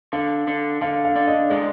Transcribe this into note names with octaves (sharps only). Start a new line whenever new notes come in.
D3 F5
D3
D3 F5
F5
D4
D#5
G#3 D5